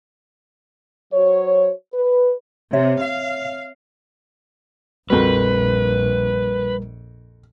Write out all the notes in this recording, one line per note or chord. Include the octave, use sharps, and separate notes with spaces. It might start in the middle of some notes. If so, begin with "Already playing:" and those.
F#3 F#4 C5 C#5
B4
C3 C4 C#5 E5
F5
A#1 F2 G3 F#4 A#4 B4